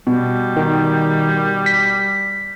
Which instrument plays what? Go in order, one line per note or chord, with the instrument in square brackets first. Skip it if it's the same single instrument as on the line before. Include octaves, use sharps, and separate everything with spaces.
[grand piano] B2 [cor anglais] G3
[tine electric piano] D#3
B6